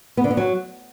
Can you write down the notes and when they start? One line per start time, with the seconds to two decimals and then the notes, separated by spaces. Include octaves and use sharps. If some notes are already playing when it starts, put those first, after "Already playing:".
0.17 B3
0.24 D3
0.31 B3
0.37 F#3